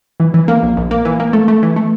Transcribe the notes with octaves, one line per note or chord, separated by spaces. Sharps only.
E3
E3
A#3
A#1
A#1
A#3
E3
A#3
A3
A3
E3
A3